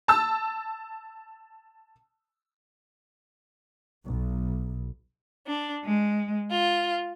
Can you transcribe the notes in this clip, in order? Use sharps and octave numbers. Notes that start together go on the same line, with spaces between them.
A5 E6
B1
D4
G#3
F4